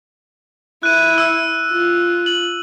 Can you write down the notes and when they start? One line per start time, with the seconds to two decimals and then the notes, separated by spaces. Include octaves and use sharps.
0.83 E4 F#6 D#7
1.18 E6
1.72 F4
2.26 F#7